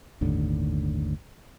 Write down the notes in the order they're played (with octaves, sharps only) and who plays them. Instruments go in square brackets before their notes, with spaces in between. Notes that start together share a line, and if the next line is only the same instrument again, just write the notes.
[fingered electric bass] G1 D#2 A2 D3